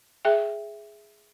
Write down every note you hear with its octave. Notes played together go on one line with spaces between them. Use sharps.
G#4 E5 G5